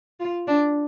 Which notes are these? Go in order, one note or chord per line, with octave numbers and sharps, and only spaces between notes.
F4
D4